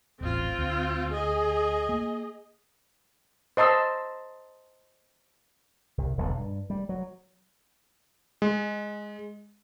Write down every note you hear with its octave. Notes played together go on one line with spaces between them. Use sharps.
D#1 A1 C4 F4
D2
G#4 D#5
A#3
C5 D#5 A5 C6 E6
C2
E1 B1 D3
G2
G3
F#3
G#3